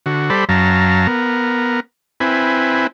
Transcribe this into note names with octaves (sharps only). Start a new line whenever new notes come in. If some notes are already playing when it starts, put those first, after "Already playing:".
D3 F#4
G3 A4 C5 D5 B5
F#2 F#3 F5 A5 A#5
B3 A#4
C4 E4 B4 G#5